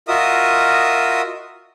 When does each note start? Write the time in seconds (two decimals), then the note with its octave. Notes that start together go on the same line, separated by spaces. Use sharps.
0.08 F4 F#4 A#4 D#5 E5 D#6